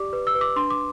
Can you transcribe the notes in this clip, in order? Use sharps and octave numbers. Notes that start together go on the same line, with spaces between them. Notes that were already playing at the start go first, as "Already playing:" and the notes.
Already playing: G4 D5 D6
B4
E6
B4
D6
D4 C6
D6